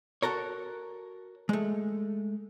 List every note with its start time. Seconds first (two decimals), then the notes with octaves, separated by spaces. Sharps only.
0.22 F#4 A4 A#4 C#5
1.49 G#3 A3